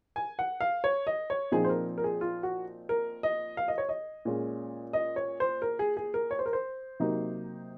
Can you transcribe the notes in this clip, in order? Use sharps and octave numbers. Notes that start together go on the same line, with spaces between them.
G#5
F#5
F5
C#5
D#5
C#5
A#2 F3 C4 D#4 G#4
C5
A#4
A#4
G#4
F4
F#4
A#4
D#5
F5
D#5
C#5
D#5
A#2 G#3 C#4
D#5
C#5
C5
A#4
G#4
G#4
A#4
C#5
C5
A#4
C5
C3 F#3 A#3 D#4